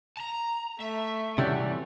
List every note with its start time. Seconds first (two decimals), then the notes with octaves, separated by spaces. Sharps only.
0.17 A5 A#5
0.80 A3 E5
1.38 C3 E3 G3 C#4 F#4 G5